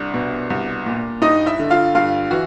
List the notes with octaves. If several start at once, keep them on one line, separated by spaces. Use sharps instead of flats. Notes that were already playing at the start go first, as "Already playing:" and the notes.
Already playing: C2 D4
B2
C2
A#2
G2 D#4 D#5
E4 E5
D3
F4 F5
G2 F4 F5
E3 F#4